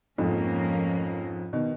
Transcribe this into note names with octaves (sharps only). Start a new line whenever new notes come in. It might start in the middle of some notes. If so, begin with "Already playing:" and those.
F2 G#2 F3 A#3 C#4
B2 D#3